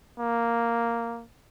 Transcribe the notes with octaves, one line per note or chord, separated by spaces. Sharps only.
A#3